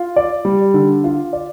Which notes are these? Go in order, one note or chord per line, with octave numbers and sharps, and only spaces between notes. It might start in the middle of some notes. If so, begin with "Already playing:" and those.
Already playing: F4
D5
G3
D3
F4
D5